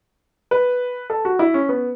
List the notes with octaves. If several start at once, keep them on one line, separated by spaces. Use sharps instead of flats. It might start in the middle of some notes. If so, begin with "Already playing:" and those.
B4
A4
F#4
E4
C#4
B3